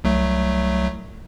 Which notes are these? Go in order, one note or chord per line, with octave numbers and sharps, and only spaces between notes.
C2 F#3 A3